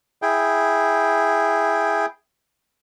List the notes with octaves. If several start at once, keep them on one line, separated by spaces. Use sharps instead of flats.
E4 G#4 G5